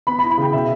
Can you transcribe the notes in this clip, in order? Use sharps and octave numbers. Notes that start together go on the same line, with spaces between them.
B3 B5
B5
E4
B5
C#3 G5
B2 E5